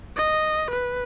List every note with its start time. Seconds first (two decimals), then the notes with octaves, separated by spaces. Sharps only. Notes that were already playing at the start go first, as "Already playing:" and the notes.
0.16 D#5
0.71 B4